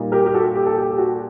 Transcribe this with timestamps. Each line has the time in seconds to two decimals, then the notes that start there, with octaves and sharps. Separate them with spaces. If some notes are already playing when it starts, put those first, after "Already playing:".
Already playing: A#2 G3 A#3 D#4
0.12 G4 A#4
0.26 G4
0.34 F#4 A4
0.55 G4
0.67 A4
0.77 G4
0.90 G4
0.98 F#4